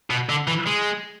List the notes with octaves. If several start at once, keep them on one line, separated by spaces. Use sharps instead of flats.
B2
D3
E3
G#3